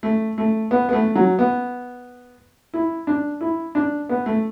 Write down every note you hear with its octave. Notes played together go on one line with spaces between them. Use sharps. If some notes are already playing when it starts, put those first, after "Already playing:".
A3
A3
B3
B3
A3
F#3
B3
E4
D4
E4
D4
B3
A3